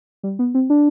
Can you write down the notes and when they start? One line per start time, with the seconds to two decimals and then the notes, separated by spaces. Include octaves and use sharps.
0.23 G3
0.39 B3
0.54 C4
0.70 D4